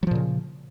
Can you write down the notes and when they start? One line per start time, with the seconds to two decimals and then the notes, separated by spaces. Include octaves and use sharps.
0.03 F#3
0.07 F3
0.11 A#2
0.15 C#3